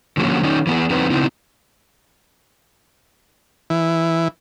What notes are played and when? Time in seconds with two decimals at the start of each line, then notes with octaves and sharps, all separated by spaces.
0.17 D3 F3 F#3 A#3 C#4 F#4
0.43 D#3 C#4 D#4
0.67 E3 B3 G#4
0.90 E2 E3 F#3 C4 D#4 B4
1.10 C#3 B3 C4 D#4 E4
3.70 E3